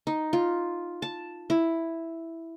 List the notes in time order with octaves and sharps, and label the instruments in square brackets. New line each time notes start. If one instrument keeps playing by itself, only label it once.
[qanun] D#4
F4
A5
E4